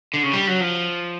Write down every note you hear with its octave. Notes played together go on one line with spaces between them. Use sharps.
D3
C#3
G3
F#3
F3